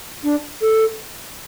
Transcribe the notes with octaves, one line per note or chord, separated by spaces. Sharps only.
D4
A4